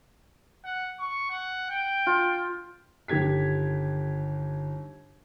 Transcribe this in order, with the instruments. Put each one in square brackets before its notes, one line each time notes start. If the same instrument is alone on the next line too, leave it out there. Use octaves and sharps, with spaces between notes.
[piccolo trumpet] F#5
C#6
F#5
G5
[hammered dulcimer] F4
[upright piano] G1 D#3 G4 G#6 B6